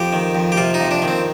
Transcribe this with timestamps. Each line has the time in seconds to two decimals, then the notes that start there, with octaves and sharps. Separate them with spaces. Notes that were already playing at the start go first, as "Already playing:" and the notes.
Already playing: F2 G4
0.13 D#3
0.35 F2
0.52 G4
0.57 C3 F4
0.74 D#4
0.80 F2
0.91 D4
1.02 D#3
1.08 C4